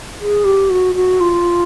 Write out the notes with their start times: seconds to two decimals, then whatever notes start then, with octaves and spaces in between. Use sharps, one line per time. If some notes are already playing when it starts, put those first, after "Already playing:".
0.20 G#4
0.45 G4
0.70 F#4
0.95 F#4
1.20 F4